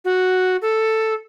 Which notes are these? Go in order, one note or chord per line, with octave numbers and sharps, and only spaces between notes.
F#4
A4